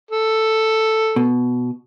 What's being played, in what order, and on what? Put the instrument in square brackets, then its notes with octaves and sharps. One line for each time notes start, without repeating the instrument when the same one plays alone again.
[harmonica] A4
[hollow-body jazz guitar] B2